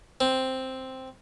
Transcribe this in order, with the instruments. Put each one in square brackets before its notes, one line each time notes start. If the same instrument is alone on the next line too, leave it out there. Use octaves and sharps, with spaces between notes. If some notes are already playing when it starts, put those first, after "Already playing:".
[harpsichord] C4